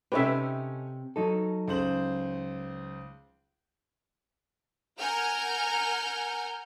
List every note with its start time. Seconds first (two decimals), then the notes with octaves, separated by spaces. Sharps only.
0.12 C3 C#4 D#4 G4 A4 B4 C#5 E5
1.16 F#3 D#4 A4
1.68 C#2 C5 F#7
5.00 A#4 F#5 G#5 F6 G6